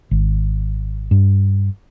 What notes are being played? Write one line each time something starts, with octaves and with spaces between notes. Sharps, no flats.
G#1
G2